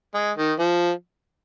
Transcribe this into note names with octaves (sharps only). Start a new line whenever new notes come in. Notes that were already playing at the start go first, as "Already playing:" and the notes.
G#3
D#3
F3